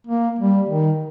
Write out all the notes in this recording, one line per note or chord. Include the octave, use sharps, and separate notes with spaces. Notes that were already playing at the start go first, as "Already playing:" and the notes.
A#3
G3
D#3